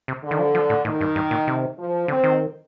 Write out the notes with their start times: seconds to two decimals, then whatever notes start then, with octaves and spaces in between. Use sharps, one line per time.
0.08 C3
0.23 D3
0.31 D#3
0.39 F3
0.55 F3
0.70 A2
0.85 A2 D#3
1.01 G2
1.16 G2
1.31 A#2
1.47 C3
1.78 F3
2.08 D3 C4
2.24 D#3